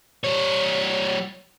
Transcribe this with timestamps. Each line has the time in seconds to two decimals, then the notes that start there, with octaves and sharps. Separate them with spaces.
0.24 G3 C#5